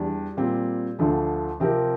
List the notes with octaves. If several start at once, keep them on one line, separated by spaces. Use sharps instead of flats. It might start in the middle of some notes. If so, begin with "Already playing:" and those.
Already playing: E2 G3 D4
A#2 G3 C4
D2 D3 F3
C3 F3 C4 G4 A#4